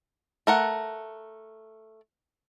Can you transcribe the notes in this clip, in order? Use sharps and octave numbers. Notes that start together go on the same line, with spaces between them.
A3 A#4 F#5